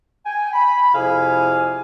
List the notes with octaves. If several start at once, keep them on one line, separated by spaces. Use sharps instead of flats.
G5 G#5
B5
F2 C3 E4 G#4 F5 G#5